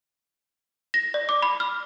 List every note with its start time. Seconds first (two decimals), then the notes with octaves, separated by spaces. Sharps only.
0.94 A#6
1.14 D5
1.29 D6
1.42 B5
1.60 F6